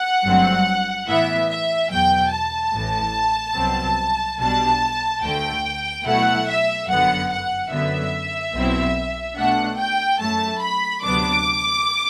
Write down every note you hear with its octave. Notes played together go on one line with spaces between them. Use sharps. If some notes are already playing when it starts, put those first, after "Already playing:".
Already playing: F#5
G1 G2 F#3 A3 C4
A2 E3 B3 E4 E5
E5
E2 B2 F#3 G5
A5
A1 A2 E3
C2 B2 F#3 C4
B1 B2 G3 D4 A5
D2 D3 A3 G5
B2 F#3 A3 E4 F#5
E5
G1 F#2 D3 F#3 B3 F#5
F#5
F#2 D3 F#3 B3 E5
B1 B2 F#3 C4 E4
B2 A3 D4 F#5
G5
F#2 F#3 A3 A5
B5
D2 C3 F#3 B3 D4 D6